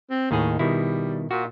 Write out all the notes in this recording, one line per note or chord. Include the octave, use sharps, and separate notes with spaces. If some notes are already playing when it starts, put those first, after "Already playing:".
C4
D#2 A2 D#3 G#4
B2 D#3 G3 E4
A#2 F#4